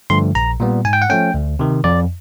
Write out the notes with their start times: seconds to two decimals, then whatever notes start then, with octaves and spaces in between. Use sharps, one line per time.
0.10 G2 D3 F3 A3 C6
0.35 A#1 A#5
0.60 A#2 G3 B3
0.85 G#2 G#5
0.93 G5
1.02 F#5
1.10 F3 A3 C#4 G5
1.34 D2
1.59 C3 D#3
1.84 F2 D5